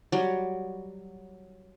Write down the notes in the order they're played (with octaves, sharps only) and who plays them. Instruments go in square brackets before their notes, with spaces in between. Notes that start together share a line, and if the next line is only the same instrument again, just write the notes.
[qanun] F#3 G3